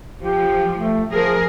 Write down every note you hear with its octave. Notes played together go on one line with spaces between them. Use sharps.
F3 G4
A3
F3 G#4 A#4